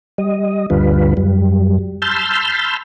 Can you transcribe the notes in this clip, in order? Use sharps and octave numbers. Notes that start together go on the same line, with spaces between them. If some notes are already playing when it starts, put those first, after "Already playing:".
G3 D#5
D2 G2 D3 G3 F4 B4
F#2 G3
A5 B5 C6 E6 F6 G6